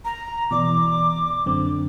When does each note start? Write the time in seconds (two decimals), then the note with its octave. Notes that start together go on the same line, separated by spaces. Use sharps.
0.05 A#5
0.51 B2 E3 D5 D6
1.46 F#2 D3 C4